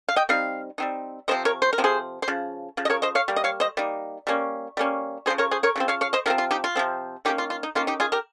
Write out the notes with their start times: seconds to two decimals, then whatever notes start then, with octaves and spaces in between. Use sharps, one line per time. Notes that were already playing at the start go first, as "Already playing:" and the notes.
0.08 F5
0.16 D#5 G5
0.29 G3 C4 D#4 F5
0.78 G3 C4 D#4
1.28 C3 F3 C4 C5 D#5
1.45 A#4 C#5
1.62 C5
1.73 A#4
1.78 C3 F3 C4
1.84 G#4 C5
2.22 C5
2.28 C#3 F3
2.77 C#3 F3
2.85 D#5
2.90 A#4 C#5
3.02 C5 D#5
3.15 C#5 F5
3.28 G3 A#3
3.36 D#5
3.44 C#5 F5
3.60 C5 D#5
3.77 G3 A#3 D#4
4.27 G3 A#3 C#4
4.77 G3 A#3 C#4
5.26 C#3 F3 C4 G#4 C5
5.38 A#4 C#5
5.51 G#4 C5
5.63 A#4 C#5
5.76 C#3 F3 C4
5.88 C#5 F5
6.01 C#5 F5
6.13 C5 D#5
6.26 C3 F3 C4 A#4
6.38 F4
6.51 D#4 G4
6.64 F4
6.76 C3 F3 C4
7.25 D#3 A#3 C#4 D#4 G4
7.38 F4
7.50 F4
7.63 D#4
7.75 D#3 A#3 C#4 F4
7.87 D#4 G4
8.00 F4 G#4
8.12 G4 A#4